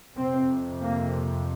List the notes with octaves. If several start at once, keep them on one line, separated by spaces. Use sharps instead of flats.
F2 C3 C4
A#3